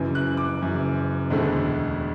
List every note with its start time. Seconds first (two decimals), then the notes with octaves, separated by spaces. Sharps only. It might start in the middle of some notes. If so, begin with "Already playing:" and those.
Already playing: F#1 F#2 E3
0.15 F#6
0.37 D6
0.61 F#1 F#2 E3
1.30 E1 D2 D3 A3